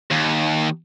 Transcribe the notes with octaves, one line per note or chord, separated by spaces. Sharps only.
D#2